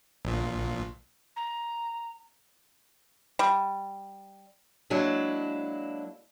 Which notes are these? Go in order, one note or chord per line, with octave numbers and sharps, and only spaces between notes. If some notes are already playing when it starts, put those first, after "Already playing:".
A#1 A#2
A#5
G3
F#3 G#3 A#3 D4 E4